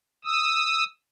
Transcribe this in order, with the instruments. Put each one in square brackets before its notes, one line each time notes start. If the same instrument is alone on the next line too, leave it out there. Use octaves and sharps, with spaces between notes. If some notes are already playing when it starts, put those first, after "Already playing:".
[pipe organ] D#6 E6